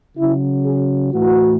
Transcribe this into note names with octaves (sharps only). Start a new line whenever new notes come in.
C#3 F#3 E4
G#4
A2 E3 F#4